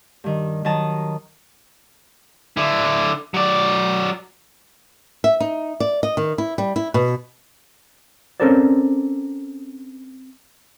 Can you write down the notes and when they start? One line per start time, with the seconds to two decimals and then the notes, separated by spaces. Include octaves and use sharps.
0.24 G2 D#3
0.65 D#3 F#3 A5 A#5 D#6
2.57 D3 E4
3.34 F#3 D5
5.24 E5
5.40 D#4
5.80 D5
6.03 D#5
6.17 D#3
6.38 E4
6.58 G3
6.76 E4
6.94 B2
8.40 C4 C#4 A4 A#4 C5 D5